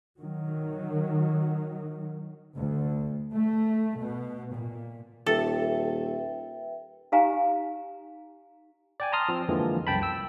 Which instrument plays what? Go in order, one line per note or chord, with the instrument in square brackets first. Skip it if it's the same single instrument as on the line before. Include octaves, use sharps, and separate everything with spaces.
[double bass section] D#3 F#3
D2
A3
B2
A#2
[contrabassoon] D#1 [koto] A4 [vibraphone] B4 E5 G5
[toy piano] D#4 G4 F5 G#5 A#5
[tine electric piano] D5 G5 G#5
A5 A#5 C6 D#6 F6
F3 C4
F2 D3 E3 F3 G#3 A#3
C2 F#2 G5 A5 B5
G5 E6